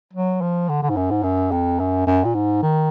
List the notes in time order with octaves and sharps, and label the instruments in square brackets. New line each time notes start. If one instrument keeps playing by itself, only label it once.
[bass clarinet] F#3
F3
D3
D3
G#2
F#2
G#2
F#2
F2
F#2
F#2
A#2
G#2
D#3